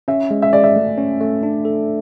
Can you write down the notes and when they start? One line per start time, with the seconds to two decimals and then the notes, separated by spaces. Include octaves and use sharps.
0.08 C#4 E5
0.31 G#3
0.42 E5
0.53 G#3 D5
0.64 E5
0.76 A3
0.98 C#4
1.21 A3
1.43 D4
1.65 A4